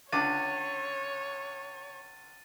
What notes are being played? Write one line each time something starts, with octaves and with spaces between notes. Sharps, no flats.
C#2 D3 C#5 D6 A6 D#7